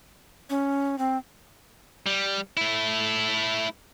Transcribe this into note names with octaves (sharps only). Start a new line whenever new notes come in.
C#4
C4
G3
A3 E4